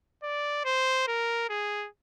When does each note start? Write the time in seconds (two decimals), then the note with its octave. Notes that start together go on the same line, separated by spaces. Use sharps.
0.23 D5
0.65 C5
1.08 A#4
1.50 G#4